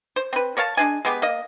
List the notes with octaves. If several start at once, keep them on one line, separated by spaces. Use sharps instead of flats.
C5
C4 B4
A#4 C#5 F5 A5
G#3 D4 G#5
G#3 B3 G4 B4
A#3 D#5